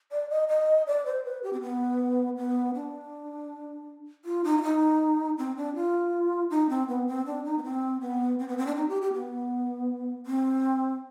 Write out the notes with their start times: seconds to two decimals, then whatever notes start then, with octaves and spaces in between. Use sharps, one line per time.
0.12 D5
0.30 D#5
0.49 D#5
0.87 D5
1.06 C5
1.25 B4
1.43 G4
1.53 C4
1.62 B3
2.37 B3
2.75 D4
4.25 F4
4.44 D#4
4.57 F4
4.62 D#4
5.38 C4
5.57 D4
5.76 F4
6.50 D#4
6.69 C4
6.88 B3
7.07 C4
7.26 D4
7.45 D#4
7.58 B3
7.64 C4
8.01 B3
8.39 C4
8.48 B3
8.58 C4
8.67 D4
8.76 D#4
8.89 G4
9.02 G4
9.14 B3
10.26 C4